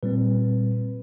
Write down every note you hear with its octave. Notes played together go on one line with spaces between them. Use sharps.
A#2 G3 C4 B4